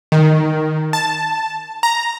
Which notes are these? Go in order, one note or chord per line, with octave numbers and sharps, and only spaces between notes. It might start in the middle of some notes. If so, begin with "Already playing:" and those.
D#3
A5
A#5